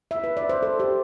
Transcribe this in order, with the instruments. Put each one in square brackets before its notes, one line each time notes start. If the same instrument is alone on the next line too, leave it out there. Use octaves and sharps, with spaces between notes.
[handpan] E5
B4
D5
C5
A4
G4